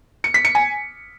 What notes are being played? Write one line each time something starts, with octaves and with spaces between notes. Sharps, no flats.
C#7
B6
C#7
G#5